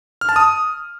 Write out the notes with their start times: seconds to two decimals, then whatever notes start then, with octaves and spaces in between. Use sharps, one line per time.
0.21 F6
0.29 A5
0.36 D#6